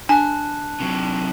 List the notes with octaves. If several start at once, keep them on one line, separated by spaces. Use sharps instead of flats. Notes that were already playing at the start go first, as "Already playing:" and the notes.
D4 G#5 A5 F#6
C3 F#3